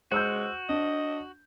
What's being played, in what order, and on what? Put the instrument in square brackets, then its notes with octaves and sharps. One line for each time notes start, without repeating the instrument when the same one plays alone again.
[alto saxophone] G#3 [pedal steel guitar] F#4 [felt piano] C5 E6 G6
[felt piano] D4 [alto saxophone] D#5